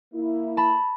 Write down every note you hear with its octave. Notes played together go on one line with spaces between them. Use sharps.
A#3 E4
A5 B5